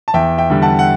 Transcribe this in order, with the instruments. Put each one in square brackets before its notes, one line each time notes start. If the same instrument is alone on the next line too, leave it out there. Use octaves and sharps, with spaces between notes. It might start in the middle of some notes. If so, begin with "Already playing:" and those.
[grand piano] A5
E2 E5 G5
E5 G5
D3 G3
F#5 A5
F#5